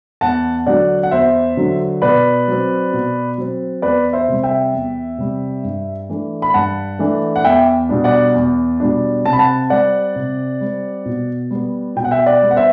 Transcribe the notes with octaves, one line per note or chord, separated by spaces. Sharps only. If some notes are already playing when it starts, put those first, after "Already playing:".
E2 F#5 A5
D3 F#3 D5 F#5
F#5
E2 C5 E5
D3 F#3
B2 B4 D5
F#3 C4
B2
F#3 C4
E2 B4 D5
C5 E5
C3 G3
E5 G5
E2
C3 G3
G2
E3 A3 D4
B5
G2 F#5 A5
E3 A3 D4
F#5
E2 E5 G5
B2 G3 D4
D5 F#5
E2
B2 G3 D4
C3 A5
B5
F#5 A5
G3 C4 D5 F#5
C3
G3 C4
B2
G3 B3
B2 G5
F#5
E5 G5
D5 F#5
G3 B3
F#5
C5 E5